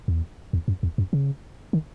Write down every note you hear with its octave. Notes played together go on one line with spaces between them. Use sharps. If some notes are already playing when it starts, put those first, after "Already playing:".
E2
E2
F#2
E2
F#2
C#3
D#3